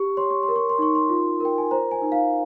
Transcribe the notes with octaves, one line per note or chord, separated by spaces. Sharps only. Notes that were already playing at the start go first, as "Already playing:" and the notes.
Already playing: G4 C#6
C#5 C6
C#6
C6
A#4
C#6
C6
D#4 C#6
C6
F4
A#4 G5
G#5
C5 A#5
G#5
D#4
F5